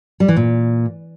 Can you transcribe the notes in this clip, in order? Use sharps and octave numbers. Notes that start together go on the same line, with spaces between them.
G3
E3
A#2